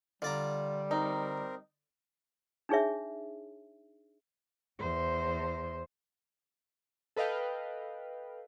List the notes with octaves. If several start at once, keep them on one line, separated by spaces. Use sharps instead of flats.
D3 G3 F4 D5 A#5
C4 D#4 A#4
D4 D#4 G#4 C#5 E5
E2 C5
A4 B4 D#5 F5 G5